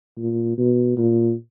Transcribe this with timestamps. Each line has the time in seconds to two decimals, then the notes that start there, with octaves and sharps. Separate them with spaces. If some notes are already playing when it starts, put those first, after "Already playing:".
0.18 A#2
0.58 B2
0.97 A#2